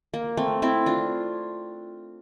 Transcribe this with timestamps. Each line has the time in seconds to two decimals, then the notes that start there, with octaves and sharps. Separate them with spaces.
0.14 A#3
0.37 A3 C4
0.62 C4 E4
0.86 D4 F4